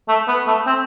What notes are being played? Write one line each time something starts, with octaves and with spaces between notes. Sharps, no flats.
A3
B3
A3
C4